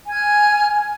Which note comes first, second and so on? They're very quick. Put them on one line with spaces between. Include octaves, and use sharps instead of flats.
G#5 G#6 F6